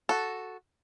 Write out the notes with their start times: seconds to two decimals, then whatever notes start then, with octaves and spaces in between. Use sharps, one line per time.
0.09 F#4 A4